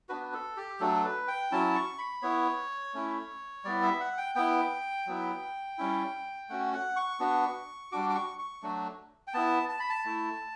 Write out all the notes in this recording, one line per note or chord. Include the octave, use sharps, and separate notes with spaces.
B3 D4 F#4 B4
A4
G4
F#3 A3 D4 A4
B4
G5
F#3 C#4 E4 A5
C#6
B5
B3 E4 C#5
A3 C#4 E4
G3 B3 E4 D5
E5
F#5
G5
B3 E4 G5
F#3 B3 E4
G3 C#4 E4
A3 C#4 F#4 F#5
F#5
C#6
B3 D4 F#4
G3 D4 F#4 D6
D6
C#6
C#6
F#3 A3 D4 F#4
G5
B3 E4 A5
A5
B5
A5
A3 E4